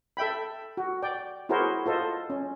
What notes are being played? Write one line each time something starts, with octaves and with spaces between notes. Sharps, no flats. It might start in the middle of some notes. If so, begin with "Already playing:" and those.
A4 E5 G5 B5
F#4
D5 G5
E4 F#4 G#4 A#4 C5 C#5
F4 A4 C5 D#5
C#4